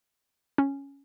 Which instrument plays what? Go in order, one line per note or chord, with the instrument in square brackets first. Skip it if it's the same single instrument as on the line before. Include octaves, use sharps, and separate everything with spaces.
[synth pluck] C#4